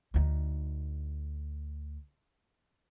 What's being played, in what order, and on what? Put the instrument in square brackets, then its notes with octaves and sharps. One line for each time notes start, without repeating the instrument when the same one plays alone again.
[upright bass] D2 D#4